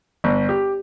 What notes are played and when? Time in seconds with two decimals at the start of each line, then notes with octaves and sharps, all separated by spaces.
0.24 G1
0.49 G4